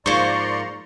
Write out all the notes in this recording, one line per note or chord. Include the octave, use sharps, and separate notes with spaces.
G#2 F3 A#3 C5 D5 A#5 C6 C#6